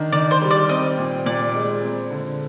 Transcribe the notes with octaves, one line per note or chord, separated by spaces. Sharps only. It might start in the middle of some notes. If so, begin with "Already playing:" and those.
Already playing: D#3 D4
D#3 D5
C5
G3
D5
C4 D#5
A#2
A#2 D5
G#3
C4
D3